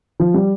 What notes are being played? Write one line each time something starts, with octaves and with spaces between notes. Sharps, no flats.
F3
G3